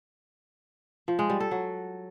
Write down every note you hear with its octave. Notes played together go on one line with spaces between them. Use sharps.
F3
G#3
G3
A4
F#3